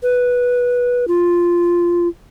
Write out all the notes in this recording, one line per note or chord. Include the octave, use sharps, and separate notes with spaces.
B4
F4